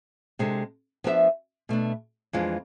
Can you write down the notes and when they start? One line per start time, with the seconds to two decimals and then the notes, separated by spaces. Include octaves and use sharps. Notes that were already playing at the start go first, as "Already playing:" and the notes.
0.39 C3 G#3 D4 A4
1.04 F3 B3 D4 A4 E5
1.69 B2 A3 D4
2.33 F2 E3 G#3 D4 F4